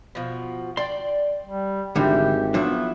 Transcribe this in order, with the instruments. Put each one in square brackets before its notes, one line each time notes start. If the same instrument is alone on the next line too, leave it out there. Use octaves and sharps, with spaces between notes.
[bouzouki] B2 F3
[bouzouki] D5 G5 [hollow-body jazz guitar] C6
[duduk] G3
[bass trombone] G#1 [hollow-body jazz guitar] D3 G3 D4 [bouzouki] E3 [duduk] G4
[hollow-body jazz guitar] F3 F#3 D4 [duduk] B3 [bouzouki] E4 A4